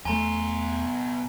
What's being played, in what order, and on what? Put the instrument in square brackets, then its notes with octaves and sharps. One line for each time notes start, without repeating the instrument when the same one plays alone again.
[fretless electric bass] E2 A3 [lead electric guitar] B2 C6 [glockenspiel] G#5 A#5